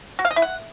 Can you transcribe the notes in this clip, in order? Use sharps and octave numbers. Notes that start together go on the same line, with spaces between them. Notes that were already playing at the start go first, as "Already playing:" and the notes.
F#4
F5
D#5
E4
F#5